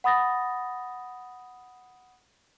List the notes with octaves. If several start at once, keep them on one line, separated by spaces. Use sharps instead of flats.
F#5 B5 D#6 A6 A#6